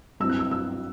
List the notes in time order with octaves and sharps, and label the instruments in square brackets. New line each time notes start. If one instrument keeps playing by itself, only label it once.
[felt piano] G2 F#3 C4 E4 E6
F#6
E6
E6